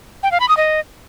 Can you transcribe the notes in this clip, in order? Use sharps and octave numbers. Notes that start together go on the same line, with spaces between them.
G5
F5
B5
D#6
D#5